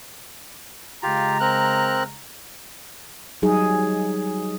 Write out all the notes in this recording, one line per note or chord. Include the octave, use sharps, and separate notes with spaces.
C#3 G#3 F4 G4 A#5
C4 A#4 F#6
F#3 G3 D#4 G#4